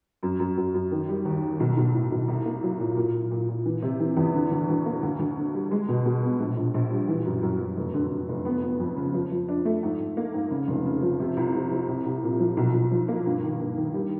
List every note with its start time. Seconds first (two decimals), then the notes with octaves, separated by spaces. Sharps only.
0.23 F#2
0.39 F#2
0.57 F#2
0.74 F#2
0.91 D#3
1.09 G3
1.25 D#2
1.43 G3
1.60 B1
1.77 B1
1.94 A2
2.11 B1
2.28 C2
2.46 A#3
2.63 F#3
2.80 A#2
2.97 A#2
3.14 A#2
3.31 A#2
3.48 A#2
3.66 E3
3.82 C3
4.00 E3
4.17 E2
4.34 D3
4.51 D2
4.68 D2
4.86 A#3
5.02 D2
5.19 D2
5.37 D3
5.54 G3
5.71 G#3
5.89 B2
6.06 B2
6.23 B3
6.40 A#1
6.57 A#1
6.74 A#1
6.91 G3
7.08 E3
7.25 F#2
7.43 F#2
7.60 F#2
7.77 F1
7.94 D3
8.11 D3
8.29 F1
8.45 B3
8.63 B3
8.80 F2
8.96 C#3
9.14 F3
9.31 F3
9.48 D4
9.65 A3
9.83 G#2
9.99 G#2
10.17 A#3
10.34 G#2
10.51 C#3
10.68 F1
10.85 C#3
11.02 F3
11.20 C3
11.37 C2
11.54 C3
11.71 C3
11.88 C2
12.06 C2
12.23 A#2
12.40 F3
12.57 B1
12.74 B1
12.91 F3
13.09 A#3
13.26 G2
13.43 D#3
13.60 G2
13.77 D#3
13.94 G3